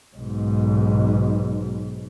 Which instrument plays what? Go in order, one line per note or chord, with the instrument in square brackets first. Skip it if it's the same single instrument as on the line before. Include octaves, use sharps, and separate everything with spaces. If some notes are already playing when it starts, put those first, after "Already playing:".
[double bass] B1 G#2